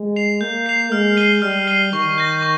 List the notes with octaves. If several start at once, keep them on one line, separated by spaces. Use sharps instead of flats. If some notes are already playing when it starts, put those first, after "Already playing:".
Already playing: G#3
C7 F7
A#3 G6
C7 F7
G#3 F6
C7 D#7 G7
G3 F6
C7 D#7 G7
D#3 C#6
G6 A#6
C#6